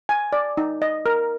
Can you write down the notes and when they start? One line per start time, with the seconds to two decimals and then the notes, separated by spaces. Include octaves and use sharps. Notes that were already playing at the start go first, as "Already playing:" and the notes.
0.09 G#5
0.33 D5
0.57 D#4
0.82 D#5
1.06 A#4